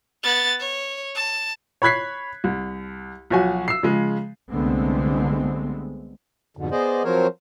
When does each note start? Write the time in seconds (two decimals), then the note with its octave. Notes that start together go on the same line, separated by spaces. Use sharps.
0.23 B3 A6
0.60 C#5
1.15 A5
1.82 C#5 B5 F#6 G#6 B6 C7
2.44 C2
3.30 B1 F3 F#4 C#5 G#5
3.68 E6 C7
3.83 C#3 F3 G#3
4.51 C2 D3 G#3 A3 B3 C4
6.57 F2 G#2 B2 D3
6.71 B3 G#4 C5 D5 D#5
7.04 F3 F#3 C4 A#4 C5 C#5